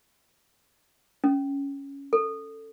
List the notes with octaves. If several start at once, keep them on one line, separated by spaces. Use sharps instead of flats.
C#4
A4